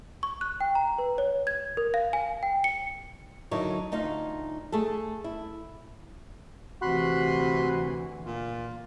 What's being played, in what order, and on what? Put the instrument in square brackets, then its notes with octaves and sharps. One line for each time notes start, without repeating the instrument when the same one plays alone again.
[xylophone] C#6
F#6
G5
A#5
B4
C#5
G#6
A#4
F5
G#5
G5
C#7
[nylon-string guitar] D3 F#3 D#4 E4 A#4 C#5
D2 D#4 F4 F5
A3 G#4 A4
E4
[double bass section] D2 E3 [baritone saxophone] C3 [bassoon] F#4 [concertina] B5 C6 F#6
[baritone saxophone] A#2 [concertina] F4